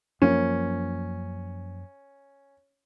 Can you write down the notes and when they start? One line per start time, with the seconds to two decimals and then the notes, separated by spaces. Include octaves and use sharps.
0.22 F#2 F3 A#3 C#4